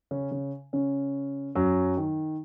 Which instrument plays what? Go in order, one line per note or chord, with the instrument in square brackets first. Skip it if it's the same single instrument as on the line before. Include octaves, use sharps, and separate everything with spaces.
[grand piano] C#3 C#4
C#3 C#4
C#3 C#4
F#2 F#3
D#3